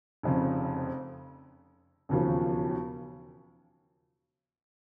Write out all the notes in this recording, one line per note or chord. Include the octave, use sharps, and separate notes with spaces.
F1 F2 C#3
E1 D#2 C#3 F3